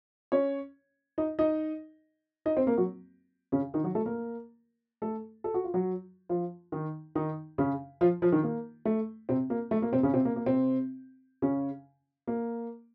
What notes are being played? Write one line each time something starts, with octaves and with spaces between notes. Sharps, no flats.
C#4 C#5
D#4 D#5
D#4 D#5
D#4 D#5
C4 C5
A#3 A#4
F#3 F#4
C#3 C#4
D#3 D#4
F#3 F#4
A3 A4
A#3 A#4
A3 A4
A4
F#4
F4
F#3 F#4
F3 F4
D#3 D#4
D#3 D#4
C#3 C#4
F3 F4
F3 F4
D#3 D#4
A#3
A3
C3 C4
A#3
A3
A#3
C3 C4
C#3 C#4
C3 C4
A#3
A#3
C3 C4
C#3 C#4
A#3